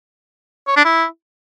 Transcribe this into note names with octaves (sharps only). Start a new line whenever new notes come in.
C#5
D4
E4